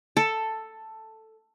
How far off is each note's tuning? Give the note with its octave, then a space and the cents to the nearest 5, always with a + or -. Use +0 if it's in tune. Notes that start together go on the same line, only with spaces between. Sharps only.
A4 +5